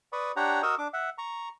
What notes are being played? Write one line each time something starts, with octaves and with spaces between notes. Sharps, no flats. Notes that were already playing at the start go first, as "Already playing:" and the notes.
B4 D5 B5 C#6 D#6
D4 G4 C#5 F#5 G5 A#5
F#4 A#4 D#5 C#6 D#6 E6
D4 D6
E5 F#5
A#5 C#6